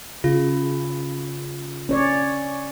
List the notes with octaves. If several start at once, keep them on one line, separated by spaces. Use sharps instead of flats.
C#3 F4
C#4 C#5 D5